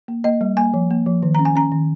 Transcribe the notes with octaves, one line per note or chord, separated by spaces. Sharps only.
A#3
A#3 D#5
G3
A#3 G#5
F3
A#3
F3
D#3
C#4 A#5
G#5
C#4 A#5
D#3